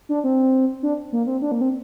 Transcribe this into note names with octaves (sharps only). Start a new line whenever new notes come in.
D4
C4
D4
A#3
C4
D4
A#3
C4